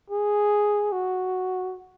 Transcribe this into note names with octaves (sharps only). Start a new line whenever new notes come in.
G#4
F#4